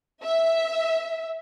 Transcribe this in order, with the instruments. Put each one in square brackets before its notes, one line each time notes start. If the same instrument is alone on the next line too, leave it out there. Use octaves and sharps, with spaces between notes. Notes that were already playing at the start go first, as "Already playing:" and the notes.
[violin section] E5